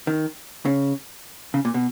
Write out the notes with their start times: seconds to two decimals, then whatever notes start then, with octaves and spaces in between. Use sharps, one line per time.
0.07 D#3
0.65 C#3
1.54 C#3
1.65 A#2
1.74 B2